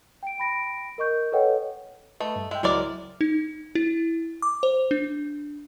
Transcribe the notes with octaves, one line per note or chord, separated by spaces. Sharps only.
G5 D7
G5 B5 A#6 D7
A#4 D#5 C#6 G6
A4 B4 C#5 D#5 F#5 G5
A3 B4 D#5 A5
G2
G#3 E5 G5
C#2 F#3 G#3 E4 A#4 D5
D#4
E4
D6
C5
D4